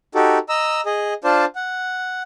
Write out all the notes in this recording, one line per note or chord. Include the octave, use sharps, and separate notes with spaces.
D#4 F#4 G4 A4
D#5 A#5 E6
G#4 D#5
D4 F4 C5 D5 A5
F#5